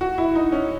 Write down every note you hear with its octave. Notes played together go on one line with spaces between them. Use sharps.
F#4
E4
D#4
C#4